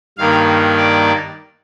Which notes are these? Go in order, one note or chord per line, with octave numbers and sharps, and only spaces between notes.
G2 D#3 A#3 F5
D5